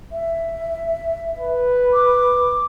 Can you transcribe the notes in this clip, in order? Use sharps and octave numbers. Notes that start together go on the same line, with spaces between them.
E5
B4
D6